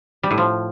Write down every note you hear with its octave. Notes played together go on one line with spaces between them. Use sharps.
G3
A2
F3